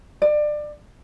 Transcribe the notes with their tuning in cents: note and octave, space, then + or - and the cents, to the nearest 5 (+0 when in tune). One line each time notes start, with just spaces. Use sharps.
D5 +25